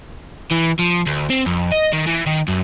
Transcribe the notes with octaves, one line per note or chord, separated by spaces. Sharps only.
E3
F3
D2
C4
F2
D#5
D#3
E3
D#3
F#2